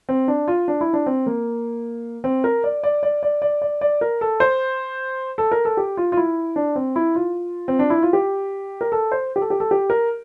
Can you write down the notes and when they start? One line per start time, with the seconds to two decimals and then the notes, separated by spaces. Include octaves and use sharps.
0.09 C4
0.28 D4
0.48 F4
0.68 D4
0.81 E4
0.93 D4
1.06 C4
1.26 A#3
2.24 C4
2.44 A#4
2.64 D5
2.83 D5
3.03 D5
3.23 D5
3.42 D5
3.62 D5
3.81 D5
4.01 A#4
4.21 A4
4.40 C5
5.38 A4
5.52 A#4
5.65 A4
5.77 G4
5.97 F4
6.12 F4
6.17 E4
6.56 D4
6.75 C4
6.96 E4
7.15 F4
7.68 C4
7.79 D4
7.90 E4
8.03 F4
8.13 G4
8.81 A#4
8.92 A4
9.12 C5
9.36 G4
9.41 A4
9.50 G4
9.60 A4
9.71 G4
9.90 A#4